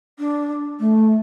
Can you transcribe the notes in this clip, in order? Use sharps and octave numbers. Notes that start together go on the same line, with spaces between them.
D4
A3